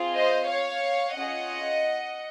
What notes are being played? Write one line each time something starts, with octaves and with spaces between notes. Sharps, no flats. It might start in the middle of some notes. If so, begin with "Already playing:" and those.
Already playing: C4 F4 G#4
C5 D#5
C#5 F5
C#4 F4 G#4 D#5 F#5